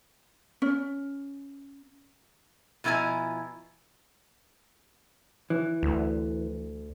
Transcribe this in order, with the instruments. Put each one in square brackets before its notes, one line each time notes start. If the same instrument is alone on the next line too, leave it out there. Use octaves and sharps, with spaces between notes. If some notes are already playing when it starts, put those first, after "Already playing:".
[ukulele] C#4
[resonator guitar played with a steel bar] B2 F3 E4 A4 G#5 A#5
[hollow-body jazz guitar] E3
[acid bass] D2